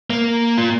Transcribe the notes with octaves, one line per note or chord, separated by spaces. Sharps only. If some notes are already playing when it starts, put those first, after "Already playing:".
A#3
F4